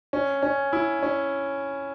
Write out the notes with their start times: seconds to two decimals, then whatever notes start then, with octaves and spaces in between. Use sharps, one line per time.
0.13 C#4
0.43 C#4
0.73 E4
1.03 C#4